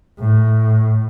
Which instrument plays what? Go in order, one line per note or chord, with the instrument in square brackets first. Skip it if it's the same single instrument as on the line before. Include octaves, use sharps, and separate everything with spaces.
[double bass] A2